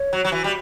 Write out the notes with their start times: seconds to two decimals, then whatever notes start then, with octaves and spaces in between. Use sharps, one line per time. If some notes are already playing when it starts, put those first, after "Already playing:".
Already playing: C#5
0.13 F#3
0.25 F#3
0.32 E3
0.44 G3